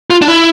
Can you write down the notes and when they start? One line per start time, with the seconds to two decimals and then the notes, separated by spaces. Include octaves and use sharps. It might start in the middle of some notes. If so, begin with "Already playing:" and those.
0.10 F4
0.22 D4
0.28 E4